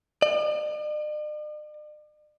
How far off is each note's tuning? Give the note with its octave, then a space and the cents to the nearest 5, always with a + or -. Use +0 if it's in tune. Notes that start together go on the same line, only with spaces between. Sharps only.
D5 +45